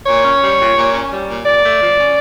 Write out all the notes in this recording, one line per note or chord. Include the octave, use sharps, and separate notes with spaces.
A#2 C#5
C#4
G3
A#2
A#2
C#4
G3
A#2
A#2 D5
A3
F3
C#4